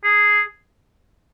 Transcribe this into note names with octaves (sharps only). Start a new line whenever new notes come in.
G#4